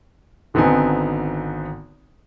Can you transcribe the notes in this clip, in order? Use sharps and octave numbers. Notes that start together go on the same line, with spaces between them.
G#1 D3 B3 C4 D#4 G#5